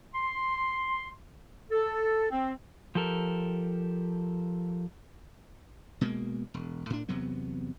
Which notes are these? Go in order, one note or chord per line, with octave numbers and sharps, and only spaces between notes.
C6
A4
C4
F3 G4 A4 A#4
B2 G#3 A#3
E1
A2 D4
E2 C3 F#3 B3